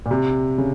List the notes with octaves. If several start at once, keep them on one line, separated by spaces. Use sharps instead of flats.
A#2
C3
C#3